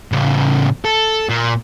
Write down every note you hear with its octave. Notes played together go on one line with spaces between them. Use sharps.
A2 C#3
A4
A#2